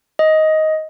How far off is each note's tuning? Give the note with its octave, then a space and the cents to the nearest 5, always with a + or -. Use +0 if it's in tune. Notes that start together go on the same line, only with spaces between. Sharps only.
D#5 +10